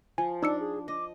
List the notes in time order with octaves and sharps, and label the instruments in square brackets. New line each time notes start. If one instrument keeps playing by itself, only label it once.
[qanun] F3 [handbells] G#5
[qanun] D4 [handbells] D#4 E6 C#7 [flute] D5
[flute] G#4
[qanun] D#5 [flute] D6